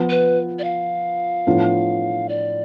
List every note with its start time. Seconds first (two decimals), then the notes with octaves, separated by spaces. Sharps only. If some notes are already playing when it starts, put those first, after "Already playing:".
Already playing: F3 B3 F4
0.10 B4
0.59 D5
0.64 F5
1.47 A2 F3 B3 D4 F4
2.29 D5